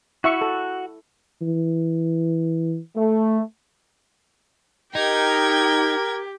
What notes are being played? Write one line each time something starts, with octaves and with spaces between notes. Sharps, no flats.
E4 F#4 E5 C#6
A4
E3
A3
D#4 G4 A#4 G5 G#6